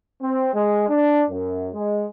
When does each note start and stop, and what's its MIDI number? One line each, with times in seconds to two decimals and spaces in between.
0.21 0.52 60
0.53 0.85 56
0.89 1.22 62
1.28 1.68 42
1.73 2.05 56